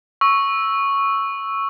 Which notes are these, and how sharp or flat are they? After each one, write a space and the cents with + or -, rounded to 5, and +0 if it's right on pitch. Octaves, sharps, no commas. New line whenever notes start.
C#6 +0 E6 -5